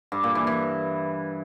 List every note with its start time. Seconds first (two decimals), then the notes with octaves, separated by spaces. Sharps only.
0.12 G2
0.24 A#2
0.35 E3
0.47 E3